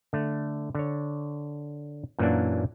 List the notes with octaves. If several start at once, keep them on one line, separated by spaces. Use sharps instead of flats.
D3 A3
D3 C#5
F#2 A#2 E3 F#3 A#3 D4